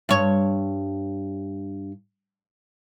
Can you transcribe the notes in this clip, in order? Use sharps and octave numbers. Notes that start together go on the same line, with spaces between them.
G2 C#5